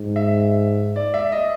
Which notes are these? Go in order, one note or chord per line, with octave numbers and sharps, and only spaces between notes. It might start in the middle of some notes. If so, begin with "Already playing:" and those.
Already playing: G#2
E5
D5
E5
D#5